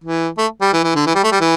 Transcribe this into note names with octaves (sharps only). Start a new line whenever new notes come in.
E3
A3
G3
E3
E3
D3
E3
G3
A3
G3
E3